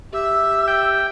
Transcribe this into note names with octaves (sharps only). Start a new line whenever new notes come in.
G4 E5 E6
G5